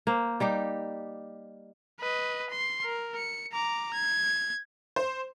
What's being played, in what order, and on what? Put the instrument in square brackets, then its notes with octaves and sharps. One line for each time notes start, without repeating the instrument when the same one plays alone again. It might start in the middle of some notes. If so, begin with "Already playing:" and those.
[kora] A#3 C5
G3 D#4 G4
[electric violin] B4 D#5
C6
A#4
C#7
A#5 D6
G#6
[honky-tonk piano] C5